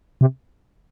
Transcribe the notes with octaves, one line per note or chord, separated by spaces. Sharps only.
C3